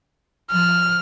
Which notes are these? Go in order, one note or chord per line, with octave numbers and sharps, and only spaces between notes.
F3 F6